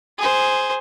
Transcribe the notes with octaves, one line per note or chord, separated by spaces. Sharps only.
G#4 C5